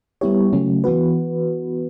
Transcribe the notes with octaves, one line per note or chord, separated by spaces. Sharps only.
G3 B3 E4 G4 C#5
C#3 F#3 A3 C#4
E3 B3 F#4 B4